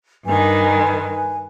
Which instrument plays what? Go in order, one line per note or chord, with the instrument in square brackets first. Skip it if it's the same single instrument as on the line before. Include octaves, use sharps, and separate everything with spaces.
[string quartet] G2 D#3 [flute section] B4 G#5